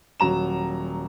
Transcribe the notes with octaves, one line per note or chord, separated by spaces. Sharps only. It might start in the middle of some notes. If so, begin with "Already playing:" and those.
D#1 F#3 A#5 E7